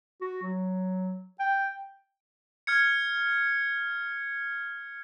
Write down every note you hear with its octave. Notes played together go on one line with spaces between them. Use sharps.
F#4
F#3
G5
F6 G#6 C#7